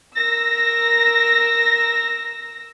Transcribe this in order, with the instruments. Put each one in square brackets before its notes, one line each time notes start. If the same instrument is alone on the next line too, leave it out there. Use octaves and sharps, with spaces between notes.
[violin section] A#4 E6 A#6